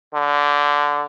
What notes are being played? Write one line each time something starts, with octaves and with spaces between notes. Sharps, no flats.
D3